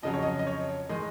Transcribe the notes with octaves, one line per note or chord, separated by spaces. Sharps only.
F2 C#3 F#3 D#5
C#5
D#5
D#5
C#5
D#3 G#3 D#5